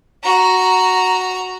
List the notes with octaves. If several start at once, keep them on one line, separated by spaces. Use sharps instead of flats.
F#4 A#5